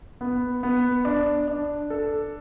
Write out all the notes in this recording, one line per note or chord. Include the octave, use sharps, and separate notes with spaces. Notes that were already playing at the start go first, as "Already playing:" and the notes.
B3
B3
D4
D4
A4